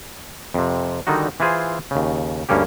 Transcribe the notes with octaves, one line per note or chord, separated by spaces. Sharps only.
F2 C3
D3 D#3 G3 D#4 F#4
E3 E4 F4 G#4 C5
D#2 C#3
D2 G2 A#3 C#4 G4